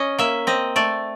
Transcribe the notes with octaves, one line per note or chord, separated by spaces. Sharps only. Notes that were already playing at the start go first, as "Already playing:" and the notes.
Already playing: C#4 D#5
A#3 E5
C4 D#5
A3 D5